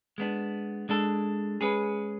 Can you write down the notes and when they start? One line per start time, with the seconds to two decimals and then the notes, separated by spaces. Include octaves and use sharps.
0.18 G#3 B3 D4
0.89 G#3 D4 A4
1.61 G#3 C#4 G#4 B4